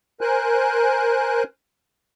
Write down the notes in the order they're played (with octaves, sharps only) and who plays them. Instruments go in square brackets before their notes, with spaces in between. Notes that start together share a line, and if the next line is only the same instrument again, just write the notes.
[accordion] A#4 C5 G#5 F#6